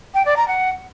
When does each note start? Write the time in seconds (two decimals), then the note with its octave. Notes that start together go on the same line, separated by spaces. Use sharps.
0.14 G5
0.25 D5
0.37 A#5
0.48 F#5